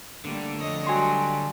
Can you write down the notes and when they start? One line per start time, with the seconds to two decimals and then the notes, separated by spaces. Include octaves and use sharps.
0.25 D3 G3 A3 A#3
0.57 F2 C#5 D#5
0.87 F#3 G3 G#5 C6